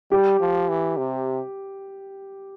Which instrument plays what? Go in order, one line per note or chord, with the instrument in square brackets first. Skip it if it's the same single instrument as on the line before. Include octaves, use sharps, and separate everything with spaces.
[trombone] G3 [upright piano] G4
[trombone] F3
E3
C3